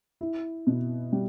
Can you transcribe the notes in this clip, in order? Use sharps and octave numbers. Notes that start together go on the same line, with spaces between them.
E4
B2
G3